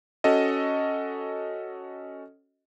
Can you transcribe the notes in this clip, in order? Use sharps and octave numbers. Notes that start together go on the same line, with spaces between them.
C#4 F#4 A4 D#5